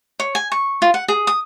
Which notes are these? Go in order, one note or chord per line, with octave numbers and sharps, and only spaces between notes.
C#5
G#5
C#6
F4
F#5
G#4
D#6